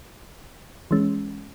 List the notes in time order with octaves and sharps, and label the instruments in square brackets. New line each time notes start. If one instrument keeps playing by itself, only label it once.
[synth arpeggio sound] E3 G#3 C#4